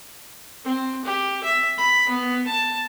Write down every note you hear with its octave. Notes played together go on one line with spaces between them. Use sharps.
C4
G4
E5
B5
B3
A5